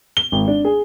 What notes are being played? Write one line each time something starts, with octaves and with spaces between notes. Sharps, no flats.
G7
G#1
D4
G#4